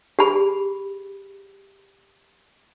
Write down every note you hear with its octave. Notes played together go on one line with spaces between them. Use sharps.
G4 G#4 B5